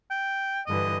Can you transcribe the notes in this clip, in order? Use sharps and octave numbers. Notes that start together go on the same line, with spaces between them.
G5
G2 D3 E3 D#5